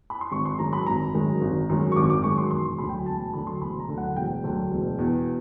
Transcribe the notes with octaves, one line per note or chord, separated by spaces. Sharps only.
B5
C6
G#1 C#6
C6
F#2 D#3 G#3 A#5
B5
G#1 A#5
F#2 D#3 G#3
G#1
F#2 D#3 G#3
C#6
G#1 D6
D6
F#2 D#3 G#3 C#6
C6
E1 C6
D2 D3 F#3 B5
G5
G#5
E1 A5
A5
D2 D3 F#3 B5
C6
E1 B5
A#5
D2 D3 F#3
F#5
E1 G5
D2 D3 F#3
E1
E2 B2